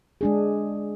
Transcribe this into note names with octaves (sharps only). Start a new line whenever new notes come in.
G#3 D4 G#4